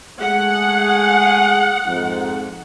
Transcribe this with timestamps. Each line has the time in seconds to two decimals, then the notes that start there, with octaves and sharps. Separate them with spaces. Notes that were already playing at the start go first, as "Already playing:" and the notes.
0.21 G#3 A3 G#4 F#5
1.86 F2 G#2